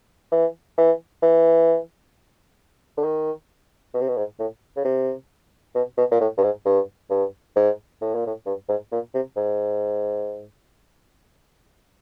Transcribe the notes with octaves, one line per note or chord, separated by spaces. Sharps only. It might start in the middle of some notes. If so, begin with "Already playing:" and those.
E3
E3
E3
D3
D#3
B2
C3
B2
G#2
A2
C#3
C3
B2
B2
A#2
A2
G2
G#2
G2
G2
G#2
A2
A#2
A2
G2
G#2
A#2
C3
G#2